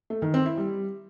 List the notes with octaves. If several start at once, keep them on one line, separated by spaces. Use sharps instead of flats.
A3
D#3
C4
E4
G3